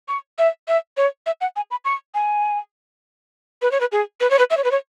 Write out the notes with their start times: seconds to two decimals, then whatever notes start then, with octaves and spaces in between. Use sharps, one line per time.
0.08 C#6
0.38 E5
0.68 E5
0.97 C#5
1.26 E5
1.41 F#5
1.56 G#5
1.71 B5
1.85 C#6
2.14 G#5
3.62 B4
3.71 C#5
3.80 B4
3.92 G#4
4.20 B4
4.30 C#5
4.39 B4
4.50 E5
4.57 C#5
4.64 B4
4.71 C#5